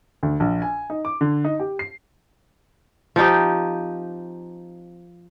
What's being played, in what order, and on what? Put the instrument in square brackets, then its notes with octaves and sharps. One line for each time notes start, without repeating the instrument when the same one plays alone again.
[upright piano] D2
A#1
G#5
D#4
D6
D3
D#4
G4
C7
[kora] F3 C4 D#4 G4